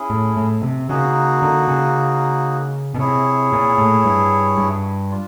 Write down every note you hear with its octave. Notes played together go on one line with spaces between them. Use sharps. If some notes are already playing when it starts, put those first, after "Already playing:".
Already playing: C#4 E4 G#4
A2
A2
C3
C#3 A#3 D#4 F#4
D3
C#3
B2
C3 E4 G#4 C#5
A#2
A2
G2
G2
D4 F4